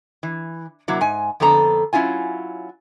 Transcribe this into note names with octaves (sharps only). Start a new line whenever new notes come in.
E3
C3 F#3 A#3 E4
G#2 G#5
F2 D3 B3 A4 A#5
F#3 C#4 E4 F4 G#5